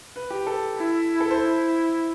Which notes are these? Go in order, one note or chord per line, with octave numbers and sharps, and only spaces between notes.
B4
G4
A4
E4
A4
C5
E4